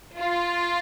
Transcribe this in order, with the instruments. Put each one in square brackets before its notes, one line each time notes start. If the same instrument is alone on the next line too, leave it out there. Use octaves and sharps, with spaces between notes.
[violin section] F4